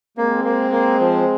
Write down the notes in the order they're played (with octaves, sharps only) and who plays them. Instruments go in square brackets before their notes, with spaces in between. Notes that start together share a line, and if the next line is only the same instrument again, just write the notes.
[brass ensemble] G#3 C4 [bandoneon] A#3
[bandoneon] A#3
A#3
F3